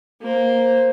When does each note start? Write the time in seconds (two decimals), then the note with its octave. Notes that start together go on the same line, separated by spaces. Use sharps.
0.21 A#3 C5